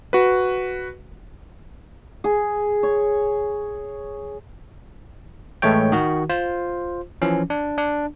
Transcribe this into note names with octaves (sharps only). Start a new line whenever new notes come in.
F#4 B4
G#4
C#5
A2 E3 G#3 A3 C#5 G5
D#3 F#4
F4 C5
E3 F3 C#4
D4
D4